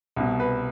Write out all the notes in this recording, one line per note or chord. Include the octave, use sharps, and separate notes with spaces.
C2 B2
B4